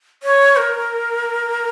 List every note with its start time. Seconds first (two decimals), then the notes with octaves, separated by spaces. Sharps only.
0.23 C#5
0.57 A#4